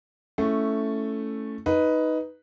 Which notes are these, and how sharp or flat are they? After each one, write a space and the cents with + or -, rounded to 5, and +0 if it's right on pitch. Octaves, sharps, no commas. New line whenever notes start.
A3 +0 C#4 +0 E4 +0
D#4 +10 B4 +0